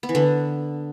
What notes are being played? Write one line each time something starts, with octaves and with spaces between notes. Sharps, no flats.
B3
E3
D3